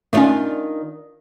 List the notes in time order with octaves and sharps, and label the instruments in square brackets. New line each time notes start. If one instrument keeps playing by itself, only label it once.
[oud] D#3 D4 F4 [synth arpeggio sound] A3 C#4